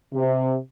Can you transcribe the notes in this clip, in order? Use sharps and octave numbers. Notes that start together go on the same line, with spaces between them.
C3